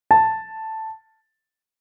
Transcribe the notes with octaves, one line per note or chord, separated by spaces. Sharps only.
A5